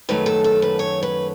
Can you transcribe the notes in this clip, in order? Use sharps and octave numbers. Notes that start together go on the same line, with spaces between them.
F#2 D#3 F#3 A3 B4
A4
A4
B4
C#5
B4